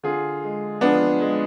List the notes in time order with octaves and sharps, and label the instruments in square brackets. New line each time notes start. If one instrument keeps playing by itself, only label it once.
[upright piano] D3 F4 G#4
G#3
F3 B3 D4
G#3